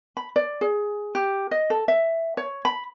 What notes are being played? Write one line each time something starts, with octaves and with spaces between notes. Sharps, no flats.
B5
D5
G#4
G4
D#5
A4
E5
C#5
B5